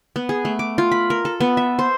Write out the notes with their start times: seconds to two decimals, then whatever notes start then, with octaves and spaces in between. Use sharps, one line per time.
0.16 B3
0.29 G#4
0.45 A3
0.59 D6
0.78 F4
0.92 B5
1.10 A#4
1.25 A4
1.40 B3
1.57 E5
1.79 C5